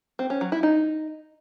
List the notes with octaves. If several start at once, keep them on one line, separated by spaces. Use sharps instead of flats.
C4
C#4
F#3
E4
D#4